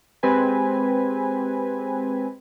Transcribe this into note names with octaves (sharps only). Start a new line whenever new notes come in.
G#3 C4 G4 B4 G#5